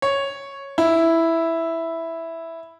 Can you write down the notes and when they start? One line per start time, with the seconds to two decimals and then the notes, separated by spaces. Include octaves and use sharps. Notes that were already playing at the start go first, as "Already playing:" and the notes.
0.02 C#5
0.78 E4